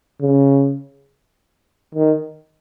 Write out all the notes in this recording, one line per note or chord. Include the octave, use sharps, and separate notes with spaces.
C#3
D#3